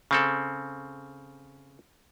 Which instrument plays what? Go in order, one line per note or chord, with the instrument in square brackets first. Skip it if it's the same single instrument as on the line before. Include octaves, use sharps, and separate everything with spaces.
[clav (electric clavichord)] C#3 C4 A4